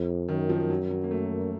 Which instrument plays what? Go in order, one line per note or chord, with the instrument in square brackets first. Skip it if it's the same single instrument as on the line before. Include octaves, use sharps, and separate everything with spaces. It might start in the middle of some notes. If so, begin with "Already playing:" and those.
Already playing: [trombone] F2
[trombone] F#2 [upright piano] D#3
[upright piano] F3
F#3
F#3
A#3
A3